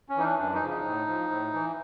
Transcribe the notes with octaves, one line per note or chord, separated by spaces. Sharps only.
C#4
E3 D#4
D4
F#2 D4
D#4
C#3 F3
D#4
A2
F3
A2
E3